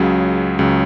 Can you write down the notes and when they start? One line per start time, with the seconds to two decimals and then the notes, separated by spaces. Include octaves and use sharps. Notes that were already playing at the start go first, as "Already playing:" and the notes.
Already playing: C#2 C#3 F#3
0.59 C#2 C#3 F#3